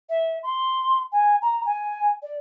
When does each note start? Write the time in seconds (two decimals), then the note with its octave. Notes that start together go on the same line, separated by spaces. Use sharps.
0.09 E5
0.43 C6
1.12 G#5
1.42 A#5
1.65 G#5
2.22 D5